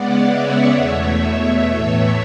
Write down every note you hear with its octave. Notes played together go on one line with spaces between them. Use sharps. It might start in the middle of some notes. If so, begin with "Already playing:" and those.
Already playing: C#3 G#3 B3 D5 F#5
C#5 E5
E2 B2 A3
C#5 E5
A2 E3 A3